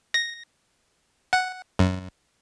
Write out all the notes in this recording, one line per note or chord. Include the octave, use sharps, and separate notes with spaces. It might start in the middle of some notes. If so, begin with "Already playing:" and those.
A#6
F#5
F#2